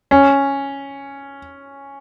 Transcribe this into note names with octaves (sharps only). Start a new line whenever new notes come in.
C#4